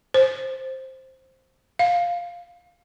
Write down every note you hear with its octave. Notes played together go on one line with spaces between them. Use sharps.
C5
F5